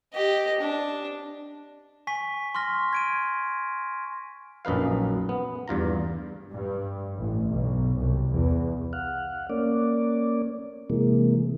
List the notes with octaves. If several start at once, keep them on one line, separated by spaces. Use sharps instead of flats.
G4 D#5
D4
G#5 C#6 B6
C6 C#6 F6 A#6
G#6 D7 D#7
A#1 F#2 D#4 B4 F5
B3
E2 G2 F4 A#5
G2
A1
B1
C2
E2
F5 F#5
A#3 C#4 D5
C3 E3 G#3 A#3